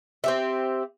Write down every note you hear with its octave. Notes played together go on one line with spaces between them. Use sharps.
C4 G4 E5